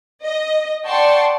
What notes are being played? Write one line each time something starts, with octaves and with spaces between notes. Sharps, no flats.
D#5
D5 F#5 G5 A5 C6 C#6